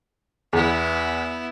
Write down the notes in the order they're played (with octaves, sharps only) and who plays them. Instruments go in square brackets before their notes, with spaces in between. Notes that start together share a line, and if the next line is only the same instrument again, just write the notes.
[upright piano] E2 [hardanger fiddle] B3 E4